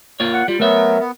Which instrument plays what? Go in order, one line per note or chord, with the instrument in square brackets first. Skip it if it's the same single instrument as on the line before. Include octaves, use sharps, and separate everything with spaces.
[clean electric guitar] A#3 F4 C#5
[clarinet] F#5
[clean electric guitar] G3 [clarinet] F4
[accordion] F#3 B3 [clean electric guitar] A3 E5 [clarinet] A#4
[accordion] B3